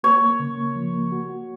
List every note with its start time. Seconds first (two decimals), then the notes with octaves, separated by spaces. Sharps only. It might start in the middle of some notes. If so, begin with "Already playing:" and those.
0.03 A#3 C#5
0.22 A#3
0.40 C#3
0.58 A#3
0.75 F3
0.94 A#3
1.12 F#4
1.29 F#4